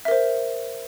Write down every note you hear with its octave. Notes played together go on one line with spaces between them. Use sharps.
A#4 C5 E5